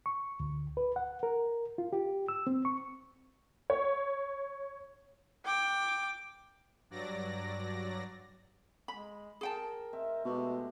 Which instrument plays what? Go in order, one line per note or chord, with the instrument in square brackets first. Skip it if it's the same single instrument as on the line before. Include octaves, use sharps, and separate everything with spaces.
[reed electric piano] C#6
D2
B4
F#5
A#4
F4
G4
E6
C4
C#6
[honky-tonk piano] C#5
[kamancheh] G5 D6
[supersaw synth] G2 F#3 D5 A#6
[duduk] G#3 [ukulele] B5
[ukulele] G#4 G5 A5 [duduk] A#4
[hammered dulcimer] C4 D#5 E5
[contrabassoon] B2 [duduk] G#3 [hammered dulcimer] A3 G4